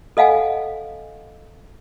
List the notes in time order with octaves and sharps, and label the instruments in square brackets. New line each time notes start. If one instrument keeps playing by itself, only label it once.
[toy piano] A4 D#5 F5 F#5 G#5